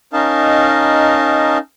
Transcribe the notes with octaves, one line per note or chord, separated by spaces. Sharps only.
C#4 D#4 A#4 D#5 F5 A5